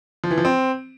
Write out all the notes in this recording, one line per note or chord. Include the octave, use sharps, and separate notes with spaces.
F3
E3
F3
C4